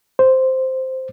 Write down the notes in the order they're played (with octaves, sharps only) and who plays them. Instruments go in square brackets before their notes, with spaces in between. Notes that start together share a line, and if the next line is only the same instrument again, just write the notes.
[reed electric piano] C5